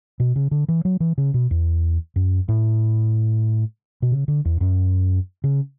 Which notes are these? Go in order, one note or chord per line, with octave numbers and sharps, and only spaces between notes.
B2
C#3
D3
E3
F#3
E3
C#3
B2
E2
F#2
A2
B2
C#3
D3
E2
F#2
C#3